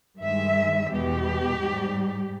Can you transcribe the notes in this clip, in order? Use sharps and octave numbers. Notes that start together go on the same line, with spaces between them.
G2 D#3 G#3 E5
E2 B2 G#3 G4
G#2 G3